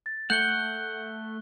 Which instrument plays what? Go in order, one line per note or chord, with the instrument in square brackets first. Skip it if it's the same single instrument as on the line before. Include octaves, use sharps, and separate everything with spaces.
[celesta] A6
[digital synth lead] A3 [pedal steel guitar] F#5 [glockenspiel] F#6 G7 [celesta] G6 C#7